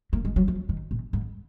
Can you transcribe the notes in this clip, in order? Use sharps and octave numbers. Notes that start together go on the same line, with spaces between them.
A#3
G#3
F#3
F3
D#3
A#2
G#2